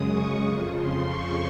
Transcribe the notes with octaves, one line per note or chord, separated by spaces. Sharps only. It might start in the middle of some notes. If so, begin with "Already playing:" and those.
Already playing: F#2 C#3 G#3 D#6
C#6
F2 C#3 F3
C6
C#6